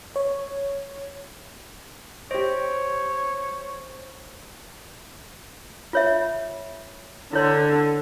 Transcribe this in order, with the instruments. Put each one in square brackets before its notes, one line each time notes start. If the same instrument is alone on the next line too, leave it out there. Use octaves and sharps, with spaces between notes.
[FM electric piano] C#5
[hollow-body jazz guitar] G4 D#5 [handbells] C5 [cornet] C#5
[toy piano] F4 C#5 E5
[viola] D3 [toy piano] E4 C#5 C6